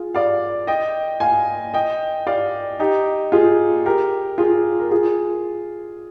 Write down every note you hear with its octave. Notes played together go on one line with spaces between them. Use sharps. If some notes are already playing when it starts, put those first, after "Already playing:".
Already playing: F4 G#4
D5 F5
D#5 G5
F5 G#5
D#5 G5
D5 F5
D#4 G4
F4 G#4
G4 A#4
F4 G#4
A#4
F4 G#4